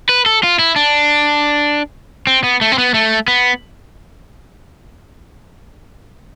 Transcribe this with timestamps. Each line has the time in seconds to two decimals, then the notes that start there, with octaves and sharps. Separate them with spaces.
0.09 B4
0.26 A4
0.44 F4
0.59 E4
0.76 D4
2.27 C4
2.44 B3
2.61 A3
2.72 C4
2.78 B3
2.94 A3
3.28 B3